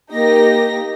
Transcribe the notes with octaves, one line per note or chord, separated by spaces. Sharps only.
A#3 D#4 G4 A#6